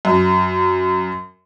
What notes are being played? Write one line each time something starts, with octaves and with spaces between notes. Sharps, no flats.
F#2